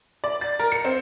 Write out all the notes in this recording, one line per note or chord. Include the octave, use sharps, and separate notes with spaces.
D5
A6
A#4
C#7
C4